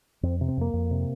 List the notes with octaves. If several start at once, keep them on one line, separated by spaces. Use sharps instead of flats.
F2 C4
C3
C4
F2 A#3
F2
C3